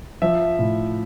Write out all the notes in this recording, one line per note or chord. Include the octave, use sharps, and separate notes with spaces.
F3 E5
A2